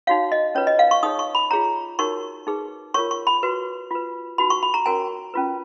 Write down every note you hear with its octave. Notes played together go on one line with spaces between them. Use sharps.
D#4 F#4 C#5 F5
D#5
C#4 F4 B4 C#5
D#5
F5
C#6
D#4 G#4 C#5 D#6
C#6
B5
F4 G#4 C#5 A#5
D#4 F#4 A#4 C#5 C#6
D#4 G#4 B4
F4 A#4 C#5 C#6
C#6
B5
F#4 B4
F4 B4
D#4 F#4 B4 B5
C#6
B5
A#5
C#4 F#4 A#4 C#5 G#5
C#4 F4 B4